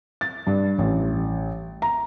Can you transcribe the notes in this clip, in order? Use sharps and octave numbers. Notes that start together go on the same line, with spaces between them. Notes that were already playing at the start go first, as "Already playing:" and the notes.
A6
G2
A1
A#5